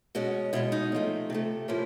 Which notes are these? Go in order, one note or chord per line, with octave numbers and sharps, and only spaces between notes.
B2 G#3 C#4 F#4
B2 G#3 C#4 E4
D#4
C3 F3 A3
C3 F3 A3
A2 F3 A#3 C#4 E4